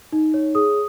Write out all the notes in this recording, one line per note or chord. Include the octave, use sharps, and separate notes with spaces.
D#4
C#5
G#4 D#6